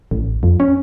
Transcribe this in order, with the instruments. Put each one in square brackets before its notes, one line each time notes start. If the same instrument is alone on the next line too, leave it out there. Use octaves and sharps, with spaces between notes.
[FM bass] A1
F2
C#4